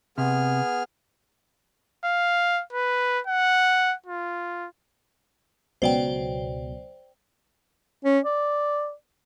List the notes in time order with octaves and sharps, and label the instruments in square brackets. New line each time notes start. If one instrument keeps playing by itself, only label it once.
[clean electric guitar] C3 [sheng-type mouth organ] B3 G#4 F6
[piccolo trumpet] F5
B4
F#5
F4
[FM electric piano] C#2 B2 F#3 [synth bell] C5 D5 G5
[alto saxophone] C#4
D5